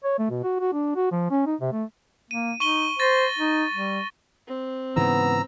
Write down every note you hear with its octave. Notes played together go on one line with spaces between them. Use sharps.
C#5
A3
B2
F#4
F#4
D4
F#4
F3
C#4
D#4
C3
A3
A#3 D#7
D#4 C#6 D#7 G7
C5 C#6 A6 A#6
D#4
G3
C4
G#2 C#3 E3 B3 A#5 E6